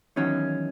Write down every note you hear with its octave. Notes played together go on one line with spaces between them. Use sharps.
E2 D#3 F#3 C#4